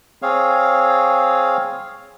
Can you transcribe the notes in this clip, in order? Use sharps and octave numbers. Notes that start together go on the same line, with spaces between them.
C4 G#4 C#5 F5